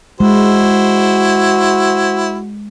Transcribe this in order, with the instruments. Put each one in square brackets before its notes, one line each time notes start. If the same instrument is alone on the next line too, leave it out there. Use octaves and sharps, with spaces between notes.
[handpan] G#3 [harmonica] E4 C5 [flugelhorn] F#4